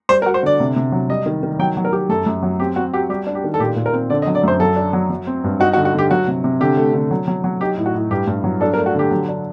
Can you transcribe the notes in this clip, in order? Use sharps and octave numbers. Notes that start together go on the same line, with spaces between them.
G3 C5
A#4
F#4
C5
D3 D5
C3
C3
F#3
G3 D#5
D#3
D#3
F#3 G5
F#3
A#4
G4
F#2 A4
F#2
F#3
C4 G4
C4 F#4
F#4 G4
G3 G4
D4
G4
D#3
A4
A#2 G4
A#2
A#4
C4
D3 D5
D#5
F#3
D5
F#2 C5
F#3 A4
D4
F#3
F#3
C4
G2
D#4 F#4
F#4
D3
F#4
D3 G4
F#3 F#4
C3
C3
D3 G4
A3
D3
F#3
F#3
F#3
D#4 G4
A2
F#4
A2
G2 G4
G2
F#3
D4 A4
A#4
A3
F#4
D3 G4
F#3
D4